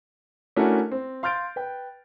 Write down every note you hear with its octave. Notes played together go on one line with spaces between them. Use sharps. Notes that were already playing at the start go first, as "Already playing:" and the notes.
A3 C#4 D4 E4 F#4 A#4
C4
F5 C6 F6 G6 A6 D7
B4 G5